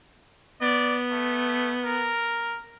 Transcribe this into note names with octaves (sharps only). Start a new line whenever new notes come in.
B3 D5
A3
A#4